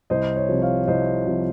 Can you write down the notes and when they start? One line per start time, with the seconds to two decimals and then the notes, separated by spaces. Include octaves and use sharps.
0.10 C2 C5 D#5
0.36 C#5
0.49 C3 F3
0.62 C#5 F5
0.88 C2 C5 D#5
1.27 C3 F3